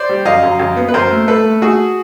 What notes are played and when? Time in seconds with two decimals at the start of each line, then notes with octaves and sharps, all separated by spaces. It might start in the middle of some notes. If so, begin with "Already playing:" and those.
Already playing: C5 D5
0.09 G3
0.25 F#2 D#5 F5
0.43 F#2
0.59 F#2
0.77 B3
0.88 B4
0.94 F#2 A#4 C5
1.11 A3
1.27 A3 A4 B4
1.44 A3
1.62 A3 F#4 G#4